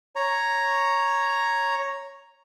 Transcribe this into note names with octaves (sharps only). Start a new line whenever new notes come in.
C#5 A#5